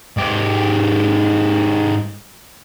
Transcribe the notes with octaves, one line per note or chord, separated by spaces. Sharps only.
G#2 G4